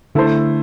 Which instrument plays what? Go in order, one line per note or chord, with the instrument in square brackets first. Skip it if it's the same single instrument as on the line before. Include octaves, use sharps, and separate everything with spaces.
[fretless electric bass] D3 [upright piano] A3 E4 A4 C5